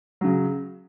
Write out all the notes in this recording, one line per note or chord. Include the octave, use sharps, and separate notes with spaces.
C#3 F#3